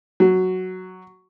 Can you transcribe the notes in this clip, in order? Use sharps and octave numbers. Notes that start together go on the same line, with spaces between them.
F#3